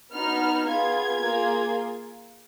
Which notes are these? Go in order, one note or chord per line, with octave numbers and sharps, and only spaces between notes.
B3 D#4 F#4 F6
B3 F4 G#4 G#6
A#3 F4 G#4